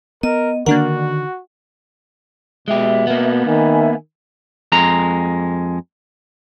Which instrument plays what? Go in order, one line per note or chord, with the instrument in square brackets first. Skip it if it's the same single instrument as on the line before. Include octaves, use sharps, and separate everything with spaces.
[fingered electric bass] B3 [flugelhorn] A#4 [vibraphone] D#5
[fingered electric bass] D3 D#3 [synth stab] A#3 D4 A#4 [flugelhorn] F#4 [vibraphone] F#5
[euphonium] B2 [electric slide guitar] G#3 G4 [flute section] E5
[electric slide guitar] A#3 B3
[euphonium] D#3 [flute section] E5 G#5 B5
[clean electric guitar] F2 G#3 A#5